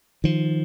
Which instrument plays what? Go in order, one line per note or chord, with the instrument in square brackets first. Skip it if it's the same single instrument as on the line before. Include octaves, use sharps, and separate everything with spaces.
[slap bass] D#3 F3